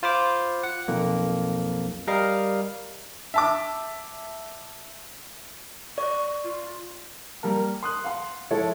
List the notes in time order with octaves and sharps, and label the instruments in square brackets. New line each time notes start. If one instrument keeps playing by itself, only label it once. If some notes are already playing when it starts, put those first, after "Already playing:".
[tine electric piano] F4 C5 B5 D6
F#5
B1 F2 A#3
G3 A#4 D#5 F5
[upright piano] E5 A5 D6
[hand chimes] D5 [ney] C#6
[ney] F4
[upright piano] G3 A#3 A#4
C6 D#6 F#6
F5 F#5 C6
F3 G#3 E4 F4 A4 C#5